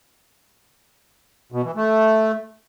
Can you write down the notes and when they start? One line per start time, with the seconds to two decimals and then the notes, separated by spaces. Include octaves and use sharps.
1.52 B2
1.64 E3
1.76 A3